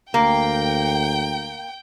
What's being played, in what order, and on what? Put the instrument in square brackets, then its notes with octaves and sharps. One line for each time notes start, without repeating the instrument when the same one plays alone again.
[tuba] D2 [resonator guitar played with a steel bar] A#3 [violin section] G5